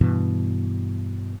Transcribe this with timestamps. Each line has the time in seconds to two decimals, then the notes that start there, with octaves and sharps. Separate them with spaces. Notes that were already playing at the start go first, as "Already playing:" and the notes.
0.01 G2 B2 E3